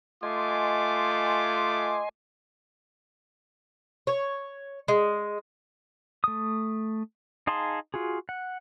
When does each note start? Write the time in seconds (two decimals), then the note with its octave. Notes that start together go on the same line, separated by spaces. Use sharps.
0.23 A3 F4 D#5 G#5 C6 D6
4.07 C#5
4.88 G#3
6.24 A3 D#6
7.47 D#4 G#4 F5 A5 C6
7.94 F4 F#4 G#4
8.29 F#5